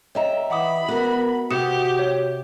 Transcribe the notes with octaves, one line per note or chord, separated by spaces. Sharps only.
G4 C#5 D#5 E5 A#5
E3 F#5 B5 D6 D#6
B3 F#4 A#4
C3 F#4 G4 D#6 C#7 E7
C#5